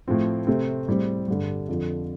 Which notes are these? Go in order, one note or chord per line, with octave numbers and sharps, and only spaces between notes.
A2 F3 C4
C3 A3 C4
A2 G3 C4
G2 D3 G3
F2 D3 F3